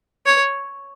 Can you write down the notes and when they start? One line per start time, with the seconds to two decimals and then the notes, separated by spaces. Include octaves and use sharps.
0.26 C#5